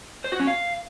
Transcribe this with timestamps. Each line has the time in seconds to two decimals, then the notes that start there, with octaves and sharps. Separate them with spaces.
0.24 C5
0.32 F#4
0.40 C#4
0.47 F5